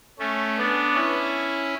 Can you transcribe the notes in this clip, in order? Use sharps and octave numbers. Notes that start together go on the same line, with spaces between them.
A3 C#4
B3 D4
C#4 E4